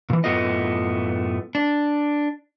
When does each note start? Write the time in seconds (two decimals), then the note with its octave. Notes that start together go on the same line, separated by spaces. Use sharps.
0.10 A#2 E3
0.24 F#2 A2 A3 B3 F4 D#5
1.55 D4